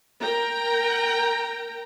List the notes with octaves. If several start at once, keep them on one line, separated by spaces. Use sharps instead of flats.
A#4 G5 A#5